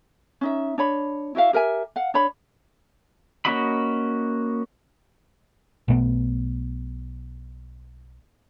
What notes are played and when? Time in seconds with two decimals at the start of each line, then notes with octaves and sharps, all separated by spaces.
0.41 C#4 D#4 E5
0.78 D4 C#5 B5
1.35 E4 F#4 E5 F5
1.53 G4 A#4 E5 G#5
1.96 F5 F#5
2.14 D4 C#5 B5
3.45 A#3 C#4 F#4 D#5 B5
5.88 B1 B2 A3 B3